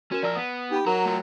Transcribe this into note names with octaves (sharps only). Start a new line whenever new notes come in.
C#4 F#4 A#4 E7
F3 A#4 D5 E6 F6
B3 D#6 B6
D#4 G4 B5
F#3 A#4 F#5 A#5
A3 F4